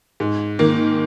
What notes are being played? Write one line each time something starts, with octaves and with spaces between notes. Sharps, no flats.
G#2
D#3 A#3